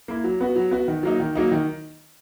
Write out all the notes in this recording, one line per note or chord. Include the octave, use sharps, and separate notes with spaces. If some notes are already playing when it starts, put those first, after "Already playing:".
A#3 E4
F#3
B3 F#4
F#3
B3 F#4
D#3
F#3 A#3 D#4
D#3
F#3 A#3 D#4
D#3